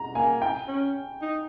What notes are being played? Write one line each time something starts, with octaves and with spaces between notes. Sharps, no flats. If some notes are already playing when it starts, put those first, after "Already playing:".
Already playing: A#5
A#3 G#5
G5
C#4
D#4